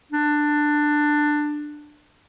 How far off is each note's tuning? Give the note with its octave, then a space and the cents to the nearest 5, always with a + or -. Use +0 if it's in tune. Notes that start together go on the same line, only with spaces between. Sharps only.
D4 +15